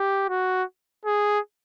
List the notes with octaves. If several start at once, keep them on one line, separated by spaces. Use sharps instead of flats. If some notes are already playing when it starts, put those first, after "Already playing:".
Already playing: G4
F#4
G#4